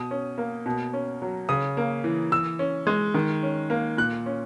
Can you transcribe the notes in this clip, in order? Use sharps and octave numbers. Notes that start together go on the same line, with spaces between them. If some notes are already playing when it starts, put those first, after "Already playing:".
Already playing: B2 D#6
C#4
A#3
B2
C#4
F#3
C#3 D#6
A#3
E3
E3 E6
C#4
G#3
D#3
C#4
A#3
A#2 F#6
C#4